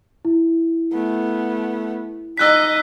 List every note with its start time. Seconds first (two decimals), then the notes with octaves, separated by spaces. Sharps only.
0.25 E4
0.93 A3 B3
2.38 D#4 D#5 E6 F#6 B6